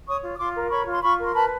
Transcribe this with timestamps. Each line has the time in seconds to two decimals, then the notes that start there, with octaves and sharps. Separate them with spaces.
0.07 C#5 C#6 D#6
0.23 F4
0.35 D#6
0.39 F4 C6 D6
0.55 A#4
0.71 C#5 B5 C#6
0.87 F4
0.92 C6
1.03 F4 B5 C#6
1.20 A#4
1.26 C6
1.35 B4 A5 B5